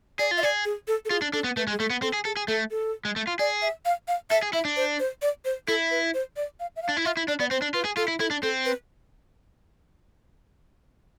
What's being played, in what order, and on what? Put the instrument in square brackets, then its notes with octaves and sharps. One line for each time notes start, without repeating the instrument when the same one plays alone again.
[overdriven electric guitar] G#4 [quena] D5
[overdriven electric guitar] F4
[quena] E5
[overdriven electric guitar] G#4 [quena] D5
[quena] G#4
A4
A4
[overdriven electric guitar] F4 [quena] G#4
[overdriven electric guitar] D4
[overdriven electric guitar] D4 [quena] A4
[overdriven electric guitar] B3
[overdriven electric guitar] A3 [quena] B4
[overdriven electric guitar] G#3
[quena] G#4
[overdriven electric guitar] A3 [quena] A4
[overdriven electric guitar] B3
[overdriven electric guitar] C4 [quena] A4
[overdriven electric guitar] G#4
[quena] G#4 [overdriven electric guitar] A4
[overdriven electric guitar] G#4
[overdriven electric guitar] A3 [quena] A4
[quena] A4
[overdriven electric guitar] G#3
A3
F4
[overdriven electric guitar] G#4 [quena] D5
[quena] E5
F5
F5
[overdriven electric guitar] A4 [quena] E5
[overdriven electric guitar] G#4
[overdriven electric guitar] E4 [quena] E5
[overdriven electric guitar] D4
[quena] C5
C5
D5
C5
[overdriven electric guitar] E4 [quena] A4
[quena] B4
C5
D5
F5
E5
F5
[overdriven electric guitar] D4
E4
[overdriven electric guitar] F4 [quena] E5
[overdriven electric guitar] E4
[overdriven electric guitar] D4 [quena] D5
[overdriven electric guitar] B3 [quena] D5
[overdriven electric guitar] C4 [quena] C5
[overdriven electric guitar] D4
[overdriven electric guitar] F4 [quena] B4
[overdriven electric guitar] G#4
[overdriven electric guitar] F4 [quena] A4
[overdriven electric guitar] E4
[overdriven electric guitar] E4 [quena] A4
[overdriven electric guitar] D4
[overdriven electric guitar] C4 [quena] A4
[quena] B4